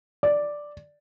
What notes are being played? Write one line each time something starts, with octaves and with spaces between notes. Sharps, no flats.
D5